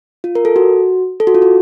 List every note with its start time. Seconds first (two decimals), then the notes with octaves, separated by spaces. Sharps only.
0.24 F4
0.35 A#4
0.45 A4
0.56 F#4
1.20 A4
1.27 F#4
1.35 F4
1.42 F#4